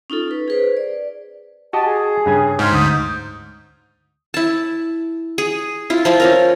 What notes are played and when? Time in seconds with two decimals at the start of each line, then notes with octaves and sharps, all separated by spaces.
0.10 C#4 D#4 F4 A4
0.28 C#4 B4
0.48 G#4 B4 C5
0.77 D5
1.73 F#4 G4 D#5 A5
1.85 G#4
2.26 G2 C#3 G#5
2.59 G#2 C6 F6 G#6
2.72 D2 D#6 G6
4.34 E4 A5
5.38 G#4
5.90 E4 F4
6.05 F3 E4 F4
6.20 C#4 F4 A#4